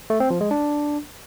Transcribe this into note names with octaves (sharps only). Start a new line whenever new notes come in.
A3
C4
F3
G#3
D4